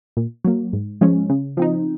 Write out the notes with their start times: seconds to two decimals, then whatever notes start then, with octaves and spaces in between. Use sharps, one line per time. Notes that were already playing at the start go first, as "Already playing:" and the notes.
0.17 A#2
0.44 F#3 A#3
0.73 G#2
1.01 F3 G#3 C#4
1.30 C#3
1.57 F3 C4 D#4